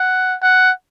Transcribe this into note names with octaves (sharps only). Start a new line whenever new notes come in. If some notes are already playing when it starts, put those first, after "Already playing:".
Already playing: F#5
F#5